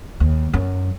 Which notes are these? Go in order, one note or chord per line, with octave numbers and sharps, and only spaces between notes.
D#2
F#2